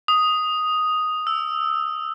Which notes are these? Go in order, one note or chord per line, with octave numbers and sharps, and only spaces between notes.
D#6
E6